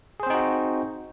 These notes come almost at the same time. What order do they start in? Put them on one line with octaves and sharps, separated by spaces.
G#4 C5 C4 D#4 F#4